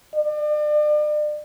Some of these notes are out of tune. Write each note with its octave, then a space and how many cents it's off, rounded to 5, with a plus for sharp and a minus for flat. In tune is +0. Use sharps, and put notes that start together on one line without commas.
D5 +35